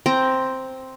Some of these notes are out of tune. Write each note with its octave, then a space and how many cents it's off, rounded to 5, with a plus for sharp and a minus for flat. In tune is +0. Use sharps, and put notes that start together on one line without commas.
C4 +0 G5 +0 A#5 +15